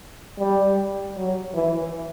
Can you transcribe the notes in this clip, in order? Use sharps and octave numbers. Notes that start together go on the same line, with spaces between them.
G3
F#3
E3